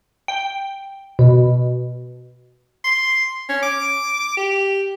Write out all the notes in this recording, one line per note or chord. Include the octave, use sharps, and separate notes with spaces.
G5
B2
C6
C#4
D6
G4